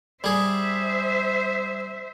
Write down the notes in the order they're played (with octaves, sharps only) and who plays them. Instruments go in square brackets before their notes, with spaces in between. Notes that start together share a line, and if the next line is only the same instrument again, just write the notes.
[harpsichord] G3 G#4 [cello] C5 E5